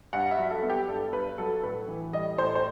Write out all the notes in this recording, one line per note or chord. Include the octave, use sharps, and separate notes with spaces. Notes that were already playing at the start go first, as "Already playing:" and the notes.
G2 F#5
E5
F#3
A4
B3
G4
G2 A4
G2 B4
F#3 A4
A2 B4
E3
G3 D#5
A2 C5
C5